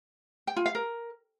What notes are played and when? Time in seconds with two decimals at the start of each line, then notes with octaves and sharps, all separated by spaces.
0.47 G5
0.56 F4
0.66 F5
0.75 A#4